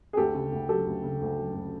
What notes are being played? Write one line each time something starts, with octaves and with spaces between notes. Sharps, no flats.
G#4
D2 G4 A4
C#3
D2
F#3 G4 A4
D2
C#3
D2
F#3
D2